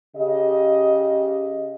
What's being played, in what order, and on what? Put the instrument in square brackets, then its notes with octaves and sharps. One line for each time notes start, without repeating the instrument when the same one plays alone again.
[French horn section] C#3 G4 D#5